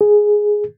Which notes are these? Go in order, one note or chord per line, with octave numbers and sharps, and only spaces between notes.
G#4